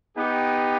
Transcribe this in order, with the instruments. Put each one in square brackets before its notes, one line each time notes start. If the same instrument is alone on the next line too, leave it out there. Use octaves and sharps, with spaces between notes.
[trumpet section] B3 D#4 G4